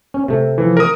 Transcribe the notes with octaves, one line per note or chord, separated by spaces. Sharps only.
C#4
C3 A3
E3 F3
A#4 D#6